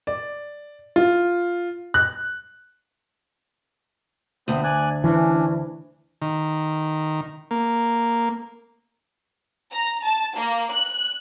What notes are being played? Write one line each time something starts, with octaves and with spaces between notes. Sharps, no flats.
D5
F4
F#6
D2 B3 C4 C5
D5 G#5 F#6
E3 C#4 D4
D#3
A#3
A#5
A5
A#3
F#6